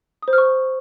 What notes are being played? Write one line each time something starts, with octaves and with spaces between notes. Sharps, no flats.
D#6
C5
F6
C#6